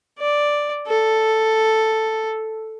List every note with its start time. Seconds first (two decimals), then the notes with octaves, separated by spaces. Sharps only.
0.19 D5
0.87 A4